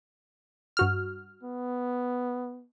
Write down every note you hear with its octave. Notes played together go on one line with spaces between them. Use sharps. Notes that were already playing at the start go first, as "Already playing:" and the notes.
G2 F#4 F6
B3